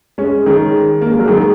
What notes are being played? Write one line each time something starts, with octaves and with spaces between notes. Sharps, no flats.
G#3 C#4
D#3 G#3
A#3
G#3
F#3
D#3 G#3